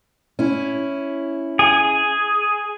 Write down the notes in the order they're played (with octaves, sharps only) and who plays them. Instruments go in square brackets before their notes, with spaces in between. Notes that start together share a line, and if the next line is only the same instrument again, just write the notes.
[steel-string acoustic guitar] C#4 E4
[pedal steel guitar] G#4